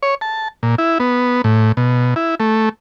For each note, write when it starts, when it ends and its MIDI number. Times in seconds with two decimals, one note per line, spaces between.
0.03 0.15 73
0.21 0.48 81
0.63 0.75 46
0.78 0.98 64
1.00 1.42 59
1.44 1.72 45
1.77 2.14 47
2.16 2.35 64
2.40 2.69 57